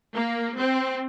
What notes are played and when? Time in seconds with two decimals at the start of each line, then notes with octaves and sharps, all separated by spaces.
0.15 A#3
0.57 C4